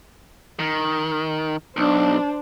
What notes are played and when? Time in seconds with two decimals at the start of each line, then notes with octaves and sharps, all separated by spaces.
0.59 D#3
1.77 B1 D4 C5